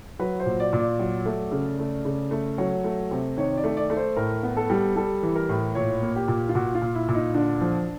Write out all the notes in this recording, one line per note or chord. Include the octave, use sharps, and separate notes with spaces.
F#3 B4
C5
A#2
D5
A#2
D5
F#3
A3
C#3
A3
C#3
A3
F#3 C#5
A3
C3
D#3 C#5
D5
A3
D5
A3
C5
A2 A#4
B3
A4
G3
G3 A4
E3
A#4
A2
A#2 C#5
A#3
G4
A#2
F4
A#2 F#4
F4
A#2
E4
A#2
D#4
D3 D4
F3